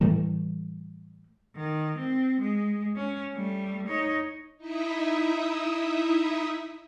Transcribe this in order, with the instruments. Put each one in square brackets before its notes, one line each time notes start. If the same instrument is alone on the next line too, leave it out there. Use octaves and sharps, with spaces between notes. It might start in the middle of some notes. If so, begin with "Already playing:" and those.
[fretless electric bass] A2 E3 G3 A3
[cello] D#3
C4
G#3
C#4
G3 A3
D#4 C#5
[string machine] D#4 E4 D#5 E5